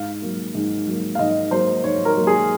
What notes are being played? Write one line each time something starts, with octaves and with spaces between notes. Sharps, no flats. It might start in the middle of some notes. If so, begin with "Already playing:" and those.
Already playing: G#2 F5
F#3 A#3
G#2
F#3 A#3
F5
G#2 D#5
F#3 A#3 C5
G#2 C#5
A#4
F#3 A#3
G#4